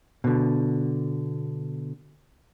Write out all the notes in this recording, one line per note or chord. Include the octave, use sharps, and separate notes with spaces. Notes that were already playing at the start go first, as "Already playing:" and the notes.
B2 D3